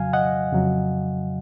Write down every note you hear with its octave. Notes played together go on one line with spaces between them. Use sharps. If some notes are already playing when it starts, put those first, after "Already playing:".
Already playing: F2 C#3 F#3 F5 G#5
D#5 F#5
F2 C#3 F#3